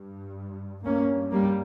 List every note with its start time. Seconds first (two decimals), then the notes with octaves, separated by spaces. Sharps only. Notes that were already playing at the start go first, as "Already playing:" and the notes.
Already playing: G2
0.85 G2 A#3 C#4
1.32 G3 A#3